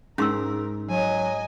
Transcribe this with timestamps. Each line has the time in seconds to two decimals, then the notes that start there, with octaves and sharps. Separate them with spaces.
0.18 G#2 C#4 A#4 C6 E6
0.90 F#3 D#5 G#5